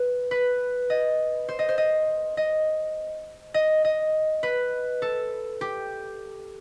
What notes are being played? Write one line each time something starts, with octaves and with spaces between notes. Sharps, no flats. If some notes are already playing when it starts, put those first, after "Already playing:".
Already playing: B4
B4
D#5
C5
D#5
C5
D#5
D#5
D#5
D#5
B4
A4
G4